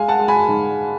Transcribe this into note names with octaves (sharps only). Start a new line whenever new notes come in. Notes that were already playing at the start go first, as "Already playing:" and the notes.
Already playing: G#3 F5 G#5
F#5 A5
G#3
G#5 B5
G#2